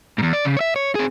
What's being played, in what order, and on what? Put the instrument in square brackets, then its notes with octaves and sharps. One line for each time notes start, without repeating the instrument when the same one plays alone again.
[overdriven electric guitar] E2 G#2
D5
C#3
C#5 E5
C#5
C4 G#4